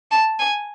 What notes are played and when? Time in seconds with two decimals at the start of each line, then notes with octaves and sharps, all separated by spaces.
0.11 A5
0.39 G#5